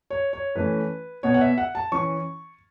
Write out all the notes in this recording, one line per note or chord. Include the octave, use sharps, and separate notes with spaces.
C#5
C#5
E3 A3 C#4 B4
B2 B3 C#5
F#5
E5
F#5
A5
E3 C#4 C#6